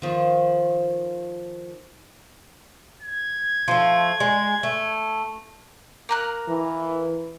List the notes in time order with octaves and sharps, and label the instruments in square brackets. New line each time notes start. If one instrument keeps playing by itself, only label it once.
[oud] D#3 F3
[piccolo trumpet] G#6
[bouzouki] F3 A3
G#3
A3
[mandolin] A#3 A#4 F#6
[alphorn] E3